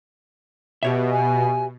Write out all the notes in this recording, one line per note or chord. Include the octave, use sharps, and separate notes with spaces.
B2 G4 C#5 E5
G#5